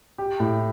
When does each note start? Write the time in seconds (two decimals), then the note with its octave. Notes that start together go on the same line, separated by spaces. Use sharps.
0.18 G4
0.40 A2